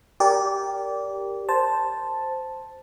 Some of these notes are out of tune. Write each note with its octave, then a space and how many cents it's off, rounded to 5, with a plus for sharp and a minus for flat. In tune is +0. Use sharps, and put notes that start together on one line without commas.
G4 +0 A#4 +0 D5 -20
C5 +0 A5 +0